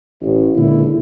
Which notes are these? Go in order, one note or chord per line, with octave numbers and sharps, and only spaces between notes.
A1
C#2 A#2 D3 E4